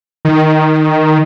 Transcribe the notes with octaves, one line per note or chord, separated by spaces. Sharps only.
D#3